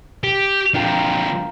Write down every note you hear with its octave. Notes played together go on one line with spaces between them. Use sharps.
G4
D3 F3 F4 A#4 G5